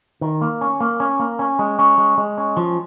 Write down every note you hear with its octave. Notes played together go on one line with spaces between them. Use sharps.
D#3
A#3
C#4
A#3
C#4
A#3
C#4
G#3
C#4
G#3
G#3
C#4
F3